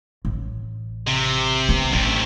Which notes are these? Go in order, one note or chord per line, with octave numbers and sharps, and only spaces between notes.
A1
C3
B3
A1 D2 C3